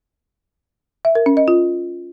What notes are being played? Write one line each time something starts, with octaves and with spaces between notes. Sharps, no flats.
E5
A#4
C#4
D#5
F4